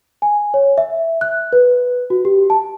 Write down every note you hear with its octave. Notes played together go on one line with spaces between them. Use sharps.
G#5
C#5
E5
F#6
B4
F#4
G4
A5